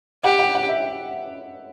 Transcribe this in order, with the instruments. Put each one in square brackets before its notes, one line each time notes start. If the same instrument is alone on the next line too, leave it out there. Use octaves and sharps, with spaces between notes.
[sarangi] G4 [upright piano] F#5
[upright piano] F#5
F#5
E5